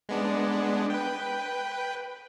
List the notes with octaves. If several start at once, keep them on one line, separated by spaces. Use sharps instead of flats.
G#3 B3 D4
B4 G5